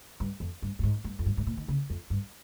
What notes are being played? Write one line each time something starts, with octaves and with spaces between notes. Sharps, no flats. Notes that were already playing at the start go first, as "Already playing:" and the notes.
G2
F2
G2
G2
G#2
G2
F2
G2
G#2
A#2
D#3
C#3
F2
G2